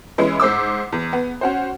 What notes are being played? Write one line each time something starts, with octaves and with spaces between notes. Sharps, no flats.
E3 G#3 C#4 E4
G#2 C5 D6 E6
E2
B3
C#4 F#4 C5